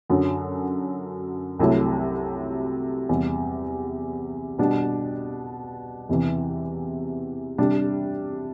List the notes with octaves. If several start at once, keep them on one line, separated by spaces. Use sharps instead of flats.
F#2 D3 F#3
C2 C3 F#3 A3 E4
E2 C3 G3
B2 G3 D4
E2 C3 E3
C3 G3 D4